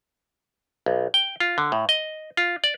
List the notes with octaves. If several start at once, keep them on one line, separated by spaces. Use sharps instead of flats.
B1
G5
F4
D3
A2
D#5
F4
D5